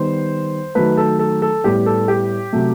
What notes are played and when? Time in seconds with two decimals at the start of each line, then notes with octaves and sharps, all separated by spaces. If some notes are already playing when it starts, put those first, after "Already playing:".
Already playing: D#3 G3 B3 C5
0.75 D#3 F#3 A3 B4
0.97 A4
1.19 A4
1.42 A4
1.64 A2 G3 B3 G4
1.86 A4
2.08 G4
2.53 C3 F#3 A3